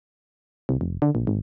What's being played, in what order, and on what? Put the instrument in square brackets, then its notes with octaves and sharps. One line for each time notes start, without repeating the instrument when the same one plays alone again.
[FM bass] C2
F1
D3
A#1
G#1